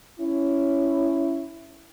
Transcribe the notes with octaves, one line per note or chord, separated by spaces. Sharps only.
C#4 E4